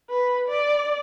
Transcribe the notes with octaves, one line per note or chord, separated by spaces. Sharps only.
B4
D5